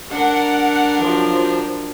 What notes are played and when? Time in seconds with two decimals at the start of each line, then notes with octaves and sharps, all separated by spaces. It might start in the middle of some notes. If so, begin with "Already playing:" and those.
0.11 D4 A#4 F#5
1.00 F3 F#3